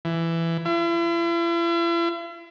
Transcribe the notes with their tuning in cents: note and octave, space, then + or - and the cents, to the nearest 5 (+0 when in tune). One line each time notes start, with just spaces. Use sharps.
E3 +15
E4 +45